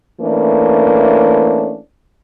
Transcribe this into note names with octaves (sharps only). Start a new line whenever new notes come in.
E3 A3 A#3 C#4 D4